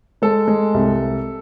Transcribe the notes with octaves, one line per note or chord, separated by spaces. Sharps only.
G#3 A4
G#3
C2